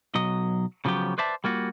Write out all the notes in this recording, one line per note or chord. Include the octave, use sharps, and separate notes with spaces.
B1 F#3 D#5
C#3 F3 F#3 B3 G4
B4 C5 D5 E5 A5
G3 A#3 F4 F#4